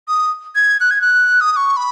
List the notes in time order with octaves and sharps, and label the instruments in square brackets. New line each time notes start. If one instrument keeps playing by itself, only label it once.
[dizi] D#6
G#6
F#6
G#6
F#6
D#6
D#6
C#6
B5